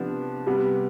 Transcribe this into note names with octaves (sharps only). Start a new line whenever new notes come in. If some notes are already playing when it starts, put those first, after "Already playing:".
Already playing: C3 F3 B3 D4
C3 G3 B3